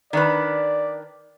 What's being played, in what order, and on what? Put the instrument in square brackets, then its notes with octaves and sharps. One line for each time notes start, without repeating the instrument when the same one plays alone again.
[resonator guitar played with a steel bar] D#3 D4 B4 [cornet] D5